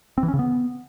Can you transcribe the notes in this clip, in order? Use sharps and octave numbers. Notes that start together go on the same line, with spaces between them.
C4
E3
C#4
C#3
B3